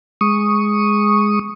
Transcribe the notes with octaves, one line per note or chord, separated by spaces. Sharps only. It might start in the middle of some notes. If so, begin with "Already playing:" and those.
G#3 C#6 D#6